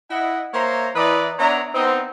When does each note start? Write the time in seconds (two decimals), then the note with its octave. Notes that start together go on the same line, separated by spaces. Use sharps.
0.10 E4 D#5 F#5
0.53 A#3 C5 C#5 E5 A#5 C6
0.96 E3 E4 B4 D5 D#5 A#5
1.39 B3 D4 C#5 E5 A#5
1.74 B3 C4 D#4